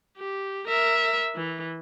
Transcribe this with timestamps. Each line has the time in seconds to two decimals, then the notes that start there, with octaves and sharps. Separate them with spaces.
0.17 G4
0.67 A#4 E5
1.35 E3